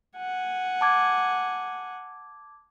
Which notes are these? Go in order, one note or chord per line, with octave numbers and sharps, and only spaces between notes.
F#5 G#5
A5 D6 G#6